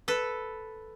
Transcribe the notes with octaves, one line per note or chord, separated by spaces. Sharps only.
A4 B4